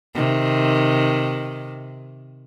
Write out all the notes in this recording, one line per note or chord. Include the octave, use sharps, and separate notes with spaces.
C3 D#3